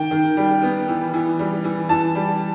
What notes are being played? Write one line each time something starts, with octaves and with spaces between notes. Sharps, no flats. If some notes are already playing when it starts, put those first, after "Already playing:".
Already playing: D#3 G5
D#3
G3
B3
E3
E3
G3
E3
E3 A5
G3